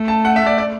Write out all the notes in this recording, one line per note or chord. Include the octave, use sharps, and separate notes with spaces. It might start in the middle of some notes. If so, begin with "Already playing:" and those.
Already playing: A3
A5
F#5
E5
D5
D5